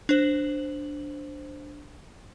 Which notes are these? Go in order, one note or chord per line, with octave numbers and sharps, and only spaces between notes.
D4 C5 F#7